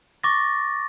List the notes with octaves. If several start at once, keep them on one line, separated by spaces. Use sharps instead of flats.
C#6 D6 A6 A#6